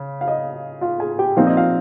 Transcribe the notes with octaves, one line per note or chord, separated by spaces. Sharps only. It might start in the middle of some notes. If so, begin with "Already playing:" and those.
Already playing: C#3
F5
D#5
F4 F5
G#4 G#5
G4 G5
A#2 F3 C4 D#4 F5
D#5
F4 F5